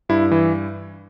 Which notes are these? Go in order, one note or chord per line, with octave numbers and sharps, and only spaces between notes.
G2 E4
E3